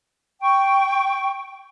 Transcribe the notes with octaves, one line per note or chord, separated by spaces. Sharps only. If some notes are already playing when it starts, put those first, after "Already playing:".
G5 C#6